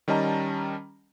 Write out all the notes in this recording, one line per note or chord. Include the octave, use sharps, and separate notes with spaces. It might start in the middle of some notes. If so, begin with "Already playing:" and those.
D#3 G3 C#4 D#5 A5 A#5